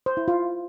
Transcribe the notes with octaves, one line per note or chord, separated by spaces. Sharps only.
C5
E4
F4